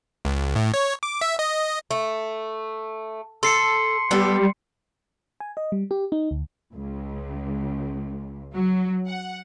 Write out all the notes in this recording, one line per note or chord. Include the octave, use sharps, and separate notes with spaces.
C#2
A2
C#5
D6
E5
D#5
A3
A4 C6 C7 C#7
G3 B3 G4 A4
G#5
D#5
G3
G4
D#4
D2
C#2
F#3
F#5